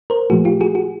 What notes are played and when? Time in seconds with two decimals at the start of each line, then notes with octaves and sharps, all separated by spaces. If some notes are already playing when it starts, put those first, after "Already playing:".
0.10 A#4 C5
0.30 A#2 F3 A3 F#4 G#4
0.45 F4 G4
0.61 F#4 G#4
0.75 F#4 G#4